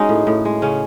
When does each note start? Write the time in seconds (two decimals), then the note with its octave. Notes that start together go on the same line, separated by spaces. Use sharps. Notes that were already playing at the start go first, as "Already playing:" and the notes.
Already playing: G#3 C#4 D#4 F#4
0.09 A2
0.27 A2
0.45 G#3
0.62 C#3 C#4